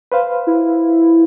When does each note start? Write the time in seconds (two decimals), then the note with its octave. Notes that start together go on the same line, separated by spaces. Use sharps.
0.12 B4 C5 F5
0.47 E4